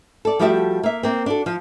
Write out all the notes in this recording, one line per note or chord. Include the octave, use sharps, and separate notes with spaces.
A4 D5
F3 G3 A3 F#4 G4 E5
A#3 E5
A#3 C4
D4 F#4 A4
F3 F4